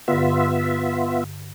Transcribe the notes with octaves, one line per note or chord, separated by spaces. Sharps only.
G2 D3 B3 F4 E5